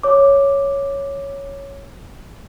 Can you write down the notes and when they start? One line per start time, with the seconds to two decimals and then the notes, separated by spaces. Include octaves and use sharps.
0.03 C#5 D6